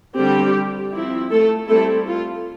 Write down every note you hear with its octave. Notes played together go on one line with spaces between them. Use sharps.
D3 G3 C4 G4
F3 C4 E4
A3 A4
G3 A3 C4 E4 A4
F4